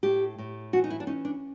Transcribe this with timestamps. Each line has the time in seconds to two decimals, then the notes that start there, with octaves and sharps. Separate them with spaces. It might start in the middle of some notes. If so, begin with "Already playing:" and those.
0.03 A2 G4
0.38 A2
0.73 E3 F#4
0.84 D#4
0.90 E4
1.00 D4
1.07 C#4 D#4
1.25 D4